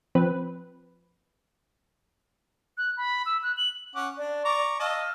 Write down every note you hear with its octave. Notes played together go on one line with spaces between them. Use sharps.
F3 C4 B4
F#6
B5
E6
F#6
F#7
C#4 F#5 D6
D4 D5
A#5 C#6 D6
D#5 F5 A5 E6 F6